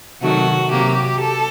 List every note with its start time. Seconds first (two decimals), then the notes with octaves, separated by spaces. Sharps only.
0.22 C3 D#3 F#3 A3 F#4
0.71 C3 F#3 A#3 G4
1.21 A4